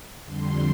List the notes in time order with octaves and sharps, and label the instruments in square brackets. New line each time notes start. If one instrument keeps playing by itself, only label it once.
[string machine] F2 D3 G3 C6